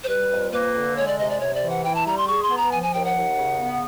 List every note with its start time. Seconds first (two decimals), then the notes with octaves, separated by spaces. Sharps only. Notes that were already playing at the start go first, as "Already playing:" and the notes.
0.04 C5
0.08 G3 B4
0.31 F2
0.52 A#3 B4
0.75 D3
0.96 G#3 C#5
1.07 D5
1.19 C3 D#5
1.30 D5
1.40 C3 C#5
1.54 D5
1.62 E3
1.70 F#5
1.84 E4 G5
1.95 A5
2.06 G3 A#5
2.18 C6
2.27 G#4 C#6
2.43 C6
2.50 B3
2.57 A#5
2.72 F3 G#5
2.83 G#5
2.94 D#2 G5
3.05 F#5
3.15 D#2
3.38 C#3
3.59 B3